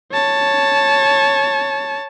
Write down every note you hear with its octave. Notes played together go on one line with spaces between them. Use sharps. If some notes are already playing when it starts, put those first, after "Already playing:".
C#5 A5